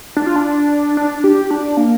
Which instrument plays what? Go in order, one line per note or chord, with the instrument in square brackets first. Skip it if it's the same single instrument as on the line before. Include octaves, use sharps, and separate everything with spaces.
[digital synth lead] D4
F4
D4
D4
G4
D4
A#3